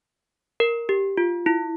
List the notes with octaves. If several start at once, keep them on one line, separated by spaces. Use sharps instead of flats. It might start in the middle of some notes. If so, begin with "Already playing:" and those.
A#4
G4
F4
E4